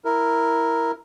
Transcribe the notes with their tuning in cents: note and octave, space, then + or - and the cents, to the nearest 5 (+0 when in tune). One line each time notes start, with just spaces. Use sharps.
E4 +0 A#4 +0